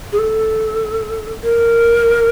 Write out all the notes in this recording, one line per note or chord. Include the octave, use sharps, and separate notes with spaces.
G#4
A4
A#4